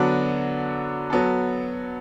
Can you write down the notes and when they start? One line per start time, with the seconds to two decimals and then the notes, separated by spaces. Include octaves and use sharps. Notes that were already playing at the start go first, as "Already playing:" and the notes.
Already playing: D3 F#3 B3 D4 F#4
1.10 F#3 B3 F#4 A4